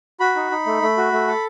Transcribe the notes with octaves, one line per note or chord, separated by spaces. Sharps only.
F#4 B5
D#4
D#4
A3
A3
F#4
A3
A4